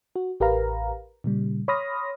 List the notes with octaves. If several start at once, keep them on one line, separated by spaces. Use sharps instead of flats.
F#4
A1 G4 A#4 B4 F5 A#5
A#2 C#3 G3
C#5 B5 C6 D#6 F6 A#6